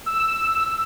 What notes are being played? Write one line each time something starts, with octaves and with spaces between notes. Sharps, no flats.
E6